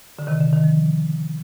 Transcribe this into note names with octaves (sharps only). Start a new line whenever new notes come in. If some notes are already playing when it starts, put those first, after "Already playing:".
D3
C3 D#3
D3
D#3
F3